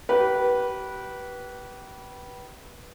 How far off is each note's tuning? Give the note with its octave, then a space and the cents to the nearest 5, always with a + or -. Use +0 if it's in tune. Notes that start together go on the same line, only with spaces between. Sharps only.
G4 -35 B4 -15